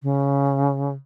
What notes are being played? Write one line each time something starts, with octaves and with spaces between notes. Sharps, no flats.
C#3